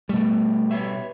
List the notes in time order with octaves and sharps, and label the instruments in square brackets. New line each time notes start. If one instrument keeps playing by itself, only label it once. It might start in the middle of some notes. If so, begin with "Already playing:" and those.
[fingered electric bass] B2 G3 [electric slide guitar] A3
[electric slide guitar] B4 C#5 E5